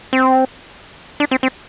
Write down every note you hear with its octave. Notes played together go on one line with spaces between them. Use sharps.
C4
D4
C4
C4